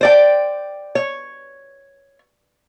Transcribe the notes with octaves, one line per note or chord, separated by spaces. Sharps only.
C5 D5 G5
C#5